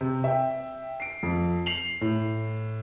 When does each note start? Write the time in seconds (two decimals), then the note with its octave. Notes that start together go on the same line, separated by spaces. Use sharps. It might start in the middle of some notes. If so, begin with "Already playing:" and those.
0.01 C3
0.24 E5 G5
1.00 C7 D7
1.23 F2
1.66 C7 F7 F#7
2.01 A2